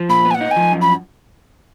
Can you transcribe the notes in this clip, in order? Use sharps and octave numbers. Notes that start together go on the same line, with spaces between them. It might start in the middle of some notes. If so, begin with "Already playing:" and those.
Already playing: F3
A#2 B5
B3
G#5
F#5
D#4
G#5
F3
F#2
B5